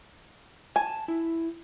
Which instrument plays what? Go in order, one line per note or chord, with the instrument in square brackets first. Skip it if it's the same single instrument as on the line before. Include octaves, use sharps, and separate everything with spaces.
[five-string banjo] G#5 [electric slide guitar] A5
[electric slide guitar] E4